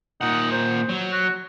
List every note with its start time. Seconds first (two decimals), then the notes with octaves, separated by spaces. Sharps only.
0.21 A#2 D#4 F#5
0.51 C5
0.89 F#3
1.12 F#4